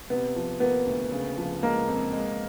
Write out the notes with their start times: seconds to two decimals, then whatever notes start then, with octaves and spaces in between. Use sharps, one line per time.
0.10 C3 B3
0.36 F3
0.60 A#3 B3
0.86 D2
1.11 C#3
1.37 F3
1.63 G#3 A#3
1.88 F2
2.13 G#3